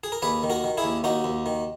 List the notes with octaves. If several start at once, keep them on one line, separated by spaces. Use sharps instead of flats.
G#4
A#4
D#2 G#4 B4
D#3
F#4 A#4
D#3
E4 G#4
D#2
D#2 D#4 F#4
D#2
D#3